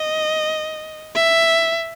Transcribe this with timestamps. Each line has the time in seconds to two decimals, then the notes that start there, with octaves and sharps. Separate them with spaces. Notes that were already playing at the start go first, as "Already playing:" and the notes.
Already playing: D#5
1.15 E5